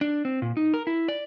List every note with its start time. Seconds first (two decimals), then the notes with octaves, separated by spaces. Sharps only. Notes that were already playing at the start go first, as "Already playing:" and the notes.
0.01 D4
0.25 C4
0.42 A#2
0.57 D#4
0.74 A#4
0.87 E4
1.08 D5